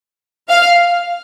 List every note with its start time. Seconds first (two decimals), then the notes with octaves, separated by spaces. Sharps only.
0.49 F5